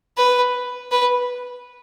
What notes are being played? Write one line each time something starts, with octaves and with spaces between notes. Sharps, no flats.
B4
B4